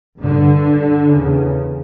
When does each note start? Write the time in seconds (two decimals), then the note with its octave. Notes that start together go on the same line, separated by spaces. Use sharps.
0.21 G2 D3
1.11 E2 C#3